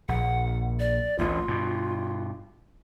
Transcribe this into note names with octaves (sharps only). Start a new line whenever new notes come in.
A#1 F#5
D5
A1 D2 F4
G2 B2